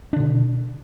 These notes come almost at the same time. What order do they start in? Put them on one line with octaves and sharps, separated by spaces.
D4 D3 B2